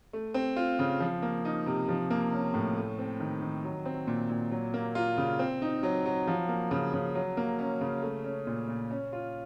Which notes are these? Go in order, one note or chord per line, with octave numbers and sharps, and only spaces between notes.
A3
C4
F4
C#3
F3
A#3
D#4
C3
F3
A#3
C#4
A2
A3
C4
D#3
D#3
F#3
C4
A#2
A#2
F#3
A#3
F4
C#3
C4
D#4
F#3
F#3
F3
A#3
C#3
C#3
F#3
A#3
C#4
C#3
A3
C#4
A#2
A#2
C#4
F4